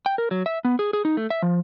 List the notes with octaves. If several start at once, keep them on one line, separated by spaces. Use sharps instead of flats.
G5
A#4
F#3
E5
B3
G#4
G#4
D#4
A3
E5
F3